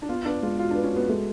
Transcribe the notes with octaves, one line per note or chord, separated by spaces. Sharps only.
D4
B3 F4
D4 B4
G#3 F4
F4 F#4
D4 B4
C#4
B3 F#4
G#3 A3